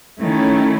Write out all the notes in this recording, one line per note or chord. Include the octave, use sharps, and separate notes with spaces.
D#3 A3 C#4 E4